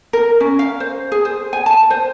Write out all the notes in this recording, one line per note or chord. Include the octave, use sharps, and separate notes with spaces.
A#4
C#4
F5
C5
G#4
C5
G#5
A5
C5